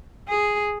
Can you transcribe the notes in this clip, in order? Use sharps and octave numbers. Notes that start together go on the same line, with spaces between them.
G#4